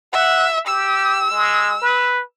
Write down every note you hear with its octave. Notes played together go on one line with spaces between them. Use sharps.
E5 F#5
G4 E6
G#3
B4